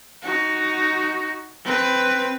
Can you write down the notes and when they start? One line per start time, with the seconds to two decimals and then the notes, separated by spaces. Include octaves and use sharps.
0.23 D#4 F#4
1.64 C4 B4